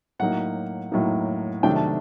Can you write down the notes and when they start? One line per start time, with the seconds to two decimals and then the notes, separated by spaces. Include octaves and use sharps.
0.19 A2 F#3 A#3 D#4 F#5
0.91 A2 F#3 A#3 D#4
1.63 C3 D#3 F#3 A3 D4 G5
1.76 A5